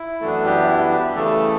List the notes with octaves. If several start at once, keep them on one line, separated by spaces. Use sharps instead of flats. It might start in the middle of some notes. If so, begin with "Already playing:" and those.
Already playing: E4
F#2 E3 A3 B3 D4 A4
G3 G4
E4
G3 G4
C#3 E3 A3 A4